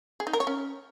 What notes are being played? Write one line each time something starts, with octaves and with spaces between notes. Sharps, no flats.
G#4
D#4
A#4
C#5
C#4